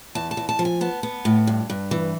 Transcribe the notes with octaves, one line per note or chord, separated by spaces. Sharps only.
E2 A5
A5
E2
A5
F3
G#5
B3 A5
B3
A2
G2
G2
E3